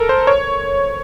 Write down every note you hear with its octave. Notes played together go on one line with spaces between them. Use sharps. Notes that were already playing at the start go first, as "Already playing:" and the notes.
Already playing: A4 A#4
C5
C#5